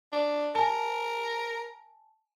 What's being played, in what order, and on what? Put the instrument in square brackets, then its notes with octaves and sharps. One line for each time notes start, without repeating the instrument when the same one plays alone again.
[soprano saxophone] D4
[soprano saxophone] A#4 [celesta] G#5 A5